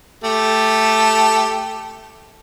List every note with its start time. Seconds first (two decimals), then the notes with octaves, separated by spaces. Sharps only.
0.24 A3 G4 A5